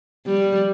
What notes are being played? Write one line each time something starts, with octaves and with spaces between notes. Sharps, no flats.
G3